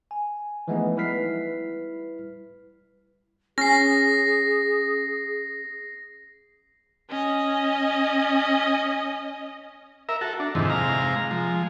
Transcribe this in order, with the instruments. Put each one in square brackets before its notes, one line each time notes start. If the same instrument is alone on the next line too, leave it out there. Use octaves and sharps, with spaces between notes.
[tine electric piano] G#5
E3 F3 G#3 A3 B3 D#4
G3 E4 B4 F6 B6 C7
[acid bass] C#4 [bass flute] G#4 [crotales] A#6 C7
[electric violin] C#4 D#5
[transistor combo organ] A#4 E5
F#4 A4
D4
F2 G#2 C3 D#3 E3
C3 G#3 F5 A#5
F3 G#3